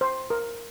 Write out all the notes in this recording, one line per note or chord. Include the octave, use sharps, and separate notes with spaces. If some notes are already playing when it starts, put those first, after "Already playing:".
C5
A#4